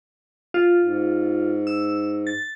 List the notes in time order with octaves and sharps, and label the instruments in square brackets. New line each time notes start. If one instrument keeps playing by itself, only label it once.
[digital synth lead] F4
[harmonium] G#2
[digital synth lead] E6
A6